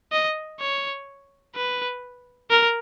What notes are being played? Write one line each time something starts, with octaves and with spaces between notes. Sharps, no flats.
D#5
C#5
B4
A#4